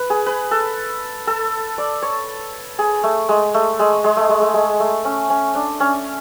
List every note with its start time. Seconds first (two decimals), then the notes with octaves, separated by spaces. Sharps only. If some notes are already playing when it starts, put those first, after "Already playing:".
Already playing: B4
0.10 G#4
0.26 B4
0.51 A4
1.27 A4
1.78 D5
2.02 C#5
2.79 G#4
3.03 A3
3.29 G#3
3.54 A3
3.79 G#3
4.04 G#3
4.17 A3
4.29 G#3
4.41 A3
4.54 G#3
4.80 A3
5.05 C#4
5.30 C#4
5.55 D4
5.80 C#4